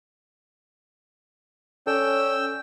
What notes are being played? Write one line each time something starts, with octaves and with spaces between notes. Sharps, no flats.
C#4 A4 D5 G5 E6